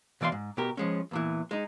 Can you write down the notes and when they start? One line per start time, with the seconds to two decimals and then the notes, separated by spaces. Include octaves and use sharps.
0.21 B2 E3 D5 F5 C6
0.32 G#2
0.57 B2 G4 A#4
0.77 F3 G#3 C#4
1.11 E2 A#2 E3
1.51 G#3 D#4